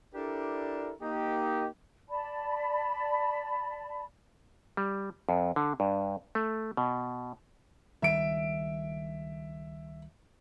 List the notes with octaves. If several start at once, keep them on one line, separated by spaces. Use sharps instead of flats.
D4 E4 G4 A4 A#4 D5
A#3 D#4 G4
D5 A5 B5
G3
F2
D3
G2
A3
B2
C#2 D#3 G3 E5 D7